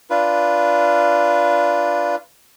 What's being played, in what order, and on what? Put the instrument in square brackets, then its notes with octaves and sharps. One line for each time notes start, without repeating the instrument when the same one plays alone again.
[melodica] D4 F4 B4